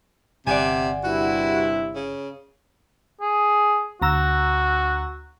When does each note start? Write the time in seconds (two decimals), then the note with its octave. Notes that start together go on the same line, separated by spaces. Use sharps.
0.47 G1 C3 D5 F#5 G#5
1.04 G2 C3 E4 F#4
1.95 C#3
3.21 G#4
4.02 D2 F#4 A#5 E6